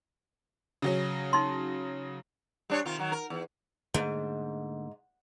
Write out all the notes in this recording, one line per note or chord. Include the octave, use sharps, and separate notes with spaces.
C#3 F#3 C#4
D#4 C6
G3 D4 C#5
C3 D#3 F4
D#3 F#3
A#4
E2
G#2 D3 A3 A#3